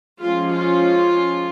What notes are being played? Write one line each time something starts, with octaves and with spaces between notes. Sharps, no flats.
F3 G#3 C#4 F4
F4